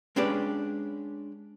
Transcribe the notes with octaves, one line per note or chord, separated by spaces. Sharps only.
G#3 C#4 D4 G4 B4 D5